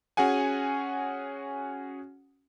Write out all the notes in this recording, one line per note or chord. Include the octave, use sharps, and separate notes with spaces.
C#4 F#4 G#4 F#5 G#5